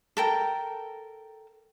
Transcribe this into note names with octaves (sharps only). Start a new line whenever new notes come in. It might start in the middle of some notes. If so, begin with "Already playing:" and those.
A4 A#4 G5